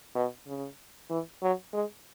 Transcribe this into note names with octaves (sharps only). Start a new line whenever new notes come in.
B2
C#3
E3
F#3
G#3